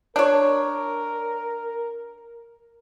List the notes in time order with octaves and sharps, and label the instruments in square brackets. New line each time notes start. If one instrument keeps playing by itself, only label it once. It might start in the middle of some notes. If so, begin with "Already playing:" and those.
[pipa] D4 C#5 [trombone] A#4